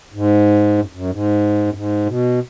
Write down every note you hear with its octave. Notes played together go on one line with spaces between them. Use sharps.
G#2
F#2
F#2
G#2
F#2
G#2
B2